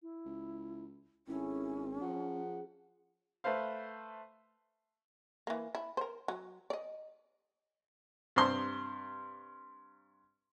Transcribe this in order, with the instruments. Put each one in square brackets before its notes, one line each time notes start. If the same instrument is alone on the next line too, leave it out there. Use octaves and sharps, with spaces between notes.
[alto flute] E4
[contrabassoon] C#2
[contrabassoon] G#1 [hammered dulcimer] D#3 G#4 A4 [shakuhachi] C#4 [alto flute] E4
[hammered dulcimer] C#3 F#3 A#5 [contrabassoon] F3 [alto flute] F#5
[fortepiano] A3 B4 C5 F5
[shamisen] E3 A#3
E4
A#4 C5
F#3
D5 D#5
[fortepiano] G2 C3 C5 C6